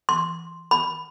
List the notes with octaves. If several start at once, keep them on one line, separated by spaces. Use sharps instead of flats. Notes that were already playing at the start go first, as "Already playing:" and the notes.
C6
B5